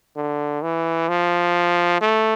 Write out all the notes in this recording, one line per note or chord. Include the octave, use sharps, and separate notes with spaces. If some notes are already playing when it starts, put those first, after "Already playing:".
D3
E3
F3
A3